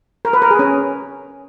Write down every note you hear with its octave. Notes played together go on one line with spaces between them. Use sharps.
A#4
B4
A#4
G#4
C#4